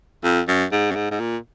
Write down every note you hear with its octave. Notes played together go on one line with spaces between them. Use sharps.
F2
F#2
G#2
F#2
G#2
G#2
A#2